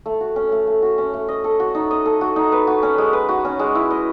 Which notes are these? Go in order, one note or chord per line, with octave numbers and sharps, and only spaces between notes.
A3
F#4
C#4
A3
A3
F#4
C#4
A3
D#5
A4
F#4
D#4
D#5
A4
F#4
D#4
B4
F#4
C#4
G#3
B4
F#4
C#4
G#3
E4
D#5